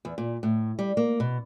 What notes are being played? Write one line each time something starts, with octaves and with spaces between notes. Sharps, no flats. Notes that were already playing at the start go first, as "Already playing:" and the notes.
E2
A#2
A2
G3
A#3
B2